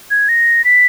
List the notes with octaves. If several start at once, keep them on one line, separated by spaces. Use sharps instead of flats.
G#6
A#6
B6